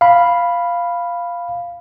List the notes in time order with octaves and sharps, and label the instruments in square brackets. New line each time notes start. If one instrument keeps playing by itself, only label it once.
[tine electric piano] F5 B5